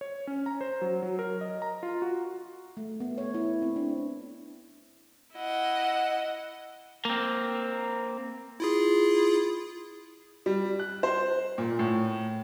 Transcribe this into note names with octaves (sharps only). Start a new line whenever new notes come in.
C#5
C#4
A#5
C5
F#3
F#3
A#4
D#5
A#5
F4
F#4
A3
B3
C#5
E4
C4
D4
E4 D#5 F#5
A#3 C4
E4 F4 G#4
G3
F#6
C5
A#2
A2